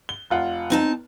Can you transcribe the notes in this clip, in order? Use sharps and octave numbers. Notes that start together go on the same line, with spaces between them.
G7
F1 F4 F#5
C4 D#4 A5